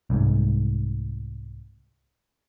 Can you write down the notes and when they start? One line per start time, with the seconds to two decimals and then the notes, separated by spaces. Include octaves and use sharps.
0.10 C2 G#2